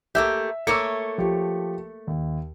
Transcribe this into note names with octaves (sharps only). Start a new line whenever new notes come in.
A3 A#3 G4 E5 E6
A3 A#3 C#5 E6 C#7
F3 G4
D#2